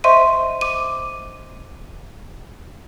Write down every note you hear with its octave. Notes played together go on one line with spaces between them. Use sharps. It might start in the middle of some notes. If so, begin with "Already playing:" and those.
C5 D#5 E5 C6 C#6 D#7
D6 D#7